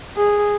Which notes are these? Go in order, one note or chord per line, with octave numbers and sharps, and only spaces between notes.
G#4